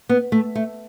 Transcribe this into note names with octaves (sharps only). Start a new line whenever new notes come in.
B3
A3
A3